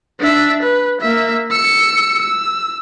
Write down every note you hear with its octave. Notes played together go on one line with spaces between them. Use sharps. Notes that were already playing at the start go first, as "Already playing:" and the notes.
D4 E5
B4
A#3 E5
E6 C#7
E6